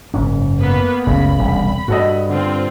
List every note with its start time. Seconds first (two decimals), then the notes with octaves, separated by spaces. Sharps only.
0.14 F#1 G#2 C#4
0.58 A#3 B3 B4
1.07 F#1 C#2 C#3 A3 B5
1.38 E1 C2
1.88 G2 F#4 A4 D#5
2.29 D3 C4 F4